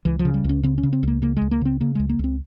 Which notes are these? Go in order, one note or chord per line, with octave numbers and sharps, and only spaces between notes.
C#2 E3
F3
C#3
G3
C#2 C#4
C#3 C4
C#4
C#3
C4
C#2 A#3
C#3 A#3
C#2 G#3
A#3
C#3 C4
C#3 A#3
C#2 G#3
A#3
C#2 C4